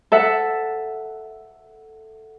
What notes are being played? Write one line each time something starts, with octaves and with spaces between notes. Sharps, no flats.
A4 E5 F#5